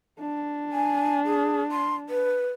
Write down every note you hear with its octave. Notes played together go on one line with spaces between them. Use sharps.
D4
G#5
G#4
C6
B4